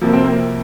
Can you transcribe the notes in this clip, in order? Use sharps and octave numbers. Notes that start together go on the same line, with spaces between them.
F2 C3 F3 A#3
C4
A#3